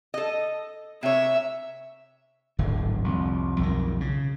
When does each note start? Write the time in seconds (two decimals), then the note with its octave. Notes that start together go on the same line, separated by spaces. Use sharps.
0.14 A4 D#5
1.03 C3 C#5 E5
2.58 D1 G#1 D3
3.04 C2 F2
3.59 B1 F2 D#3
4.01 C#3